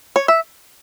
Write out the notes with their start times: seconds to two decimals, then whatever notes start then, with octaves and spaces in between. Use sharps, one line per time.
0.16 C#5
0.28 E5